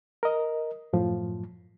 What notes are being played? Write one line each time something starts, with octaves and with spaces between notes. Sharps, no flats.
A#4 D#5
F#2 A2 F3